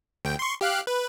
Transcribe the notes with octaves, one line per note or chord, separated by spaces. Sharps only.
D2 G5
C6 C#6
G4 F5 F#6
B4